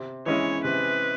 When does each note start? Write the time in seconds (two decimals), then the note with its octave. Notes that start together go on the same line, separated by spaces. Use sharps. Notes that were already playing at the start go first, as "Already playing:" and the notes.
Already playing: C3
0.26 E3 G#3 C#4 E4 C#5
0.64 C3 B4